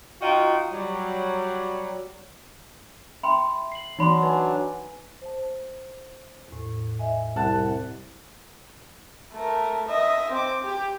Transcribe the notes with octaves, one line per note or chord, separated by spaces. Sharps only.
D#4 F4 F#4 D#5 G5
F#3 G3
E5 G5 B5 C6
C7 F#7
E3 F#3 D4 D#4 C#5 B5 C6
B4 G#5
C5 A5
E2 A2
D#5 E5 G#5
C2 F#5 A5
A3 A#4
D#5 E5
C4 D6
G4